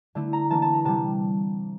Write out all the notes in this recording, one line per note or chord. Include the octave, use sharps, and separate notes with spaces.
D3 A3 E4
A#5
E3 A#3 D4 A5
A5
A#5
C3 G3 D4 A5